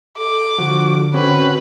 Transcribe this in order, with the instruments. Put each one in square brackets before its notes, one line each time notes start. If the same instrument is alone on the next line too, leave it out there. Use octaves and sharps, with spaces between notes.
[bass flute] A4 [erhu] D6
[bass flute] D3 [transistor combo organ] F3 F#4
[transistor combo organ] C4 C#4 F#4 [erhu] B4